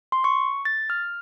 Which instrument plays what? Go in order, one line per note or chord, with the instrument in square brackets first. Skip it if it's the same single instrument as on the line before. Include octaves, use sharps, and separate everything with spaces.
[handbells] C6
C#6
A6
F6